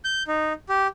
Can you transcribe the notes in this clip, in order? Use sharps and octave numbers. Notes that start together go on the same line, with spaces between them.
G6
D#4
G4